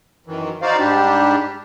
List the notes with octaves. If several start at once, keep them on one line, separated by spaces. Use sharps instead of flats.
F#2 D#3 E3
D#4 F#4 C5 D5 F5
G#2 G3 D4 G4